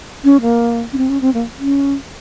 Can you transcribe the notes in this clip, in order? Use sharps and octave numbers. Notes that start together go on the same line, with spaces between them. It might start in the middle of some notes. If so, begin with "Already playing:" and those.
C#4
A#3
C#4
C4
C#4
C4
A#3
C#4